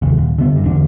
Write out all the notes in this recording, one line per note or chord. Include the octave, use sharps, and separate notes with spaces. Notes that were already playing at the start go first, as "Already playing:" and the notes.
F1 D#2
D#1
D3 B3
F#1 G2
E2 D3 D4